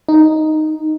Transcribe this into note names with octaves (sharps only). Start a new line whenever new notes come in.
D#4